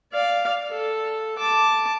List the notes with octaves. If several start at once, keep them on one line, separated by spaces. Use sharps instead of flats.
D5 F5
A4
A5 D6